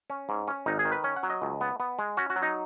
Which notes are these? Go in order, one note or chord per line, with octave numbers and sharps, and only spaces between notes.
C#4
G#2
C#4
G#1 D#4
G#4
D#3
B4
C#4 C#5
F#5
F#3
D#5
C#2
B3
B3
G#3
C#4 F#4
F#4
F#3
D#4